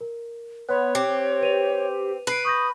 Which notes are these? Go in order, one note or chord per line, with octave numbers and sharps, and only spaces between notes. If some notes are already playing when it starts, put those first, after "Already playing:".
A#4
B3 C#5 C6 F#6
C4 G4
B4 D#7 F7
B4 F#6 C7 D7
C#6 D#6 G6 A#6